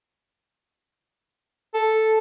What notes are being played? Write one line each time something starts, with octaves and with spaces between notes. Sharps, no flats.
A4